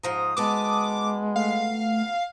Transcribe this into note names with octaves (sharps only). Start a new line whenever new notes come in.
G#2 F3 A#5 D#6
D2 G#3 B3 A5 D6
A3 F5